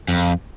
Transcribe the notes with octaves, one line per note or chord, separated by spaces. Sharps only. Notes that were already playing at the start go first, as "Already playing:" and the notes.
F2